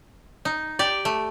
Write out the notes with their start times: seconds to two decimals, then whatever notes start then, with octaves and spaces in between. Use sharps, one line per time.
0.45 D#4
0.79 G4 D5
1.05 A3